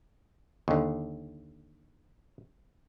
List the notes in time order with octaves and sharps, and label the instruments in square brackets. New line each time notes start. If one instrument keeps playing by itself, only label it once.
[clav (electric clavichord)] D#2 D3